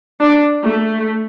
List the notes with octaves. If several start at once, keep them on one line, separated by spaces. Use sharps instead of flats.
D4
A3